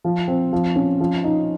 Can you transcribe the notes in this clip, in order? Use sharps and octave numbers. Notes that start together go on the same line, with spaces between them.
F3
C4
F3
C#4
F3
D#4